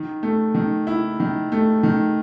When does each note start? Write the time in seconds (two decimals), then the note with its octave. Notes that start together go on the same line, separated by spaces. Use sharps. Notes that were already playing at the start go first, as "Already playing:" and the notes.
Already playing: D#3
0.23 A3
0.54 D#3
0.87 E4
1.20 D#3
1.52 A3
1.83 D#3